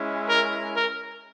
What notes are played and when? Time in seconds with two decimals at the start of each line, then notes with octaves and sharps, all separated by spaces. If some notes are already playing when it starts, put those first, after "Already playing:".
Already playing: G#3 C#4 E4
0.29 A#4
0.75 A#4